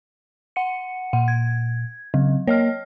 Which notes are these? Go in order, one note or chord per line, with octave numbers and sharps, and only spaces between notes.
F#5 C#7
A#2 F#5
G#6
C#3 F#3
A#3 C#5 D#5 F6